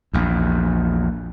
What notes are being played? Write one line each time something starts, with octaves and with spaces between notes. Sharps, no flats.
A#1 E2